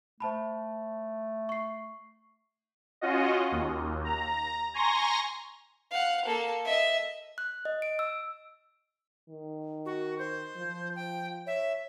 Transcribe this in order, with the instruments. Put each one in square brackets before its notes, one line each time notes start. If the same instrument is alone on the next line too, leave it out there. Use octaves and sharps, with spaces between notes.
[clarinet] A3 [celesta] C5 A5 B5
[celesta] C#6 C7
[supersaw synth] C#4 F4 F#4 D#5
D#2
A#5
G#5 A#5 C6 C#6 A#6
[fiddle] F5 F#5
A#3 A4
D#5 E5
[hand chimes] F#6
D#5
D7
E6
[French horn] D#3
[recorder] F#4
C5
[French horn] F3
[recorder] G5
[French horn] C#5 [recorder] E5